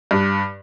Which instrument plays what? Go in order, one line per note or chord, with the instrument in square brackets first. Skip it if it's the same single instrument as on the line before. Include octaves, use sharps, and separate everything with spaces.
[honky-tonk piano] G2